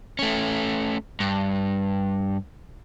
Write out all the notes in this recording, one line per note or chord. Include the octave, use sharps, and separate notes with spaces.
A3 C#4
G2